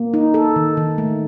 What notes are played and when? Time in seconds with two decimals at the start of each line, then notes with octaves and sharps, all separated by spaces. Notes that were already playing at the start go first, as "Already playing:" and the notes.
Already playing: A#3
0.14 D#4
0.34 A4
0.56 D#3
0.77 D#3
0.98 A3